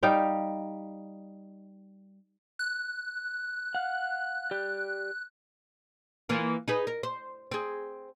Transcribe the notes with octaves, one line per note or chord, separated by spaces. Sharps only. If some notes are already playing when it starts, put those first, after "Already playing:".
G3 D#4 F5 G5
F#6
F5 F#5
G4 D5
E3 A#3 F4
D#4 G#4 B4
A#4
C5
C4 G#4